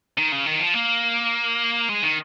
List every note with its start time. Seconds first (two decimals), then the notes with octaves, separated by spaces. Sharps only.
0.18 D#3
0.32 C#3
0.46 D#3
0.60 F3
0.75 A#3
1.90 G#3
2.03 D#3